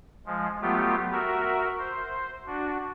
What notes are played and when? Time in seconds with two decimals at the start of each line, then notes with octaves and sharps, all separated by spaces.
0.26 F3 G#3
0.62 F#3 A3 B3 F4 G4
1.12 F#4 A#4 E5
1.79 C5
2.47 D4 F#4